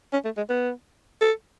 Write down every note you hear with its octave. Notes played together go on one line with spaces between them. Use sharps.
C#4
A3
G#3
B3
A4